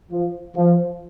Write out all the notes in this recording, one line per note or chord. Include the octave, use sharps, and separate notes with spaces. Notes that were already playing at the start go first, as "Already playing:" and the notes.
F3
F3